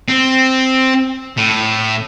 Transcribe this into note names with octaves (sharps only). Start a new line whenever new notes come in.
C4
A2